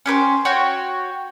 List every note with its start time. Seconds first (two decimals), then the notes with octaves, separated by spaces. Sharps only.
0.06 C#4 G4 B4 C5
0.45 F#4 C#5 G5